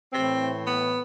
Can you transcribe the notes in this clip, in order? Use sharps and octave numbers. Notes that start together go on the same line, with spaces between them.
A2 E3 C4
B3